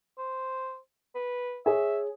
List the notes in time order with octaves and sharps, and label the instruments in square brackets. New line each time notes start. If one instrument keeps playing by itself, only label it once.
[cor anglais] C5
B4
[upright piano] G#4 C#5 [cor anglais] E5